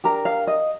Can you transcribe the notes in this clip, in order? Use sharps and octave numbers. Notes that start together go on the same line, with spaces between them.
D4 G4 A#4 A#5
F5
D#5